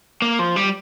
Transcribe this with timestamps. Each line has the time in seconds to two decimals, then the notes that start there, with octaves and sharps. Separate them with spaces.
0.22 A#3
0.39 F3
0.56 G3